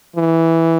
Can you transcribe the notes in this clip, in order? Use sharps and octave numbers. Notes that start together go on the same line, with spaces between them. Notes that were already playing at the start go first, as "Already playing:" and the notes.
E3